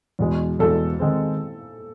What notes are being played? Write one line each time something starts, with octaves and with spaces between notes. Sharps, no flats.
E2 B2 G#3
E2 B2 G#3 A4
D#3 G#3 C4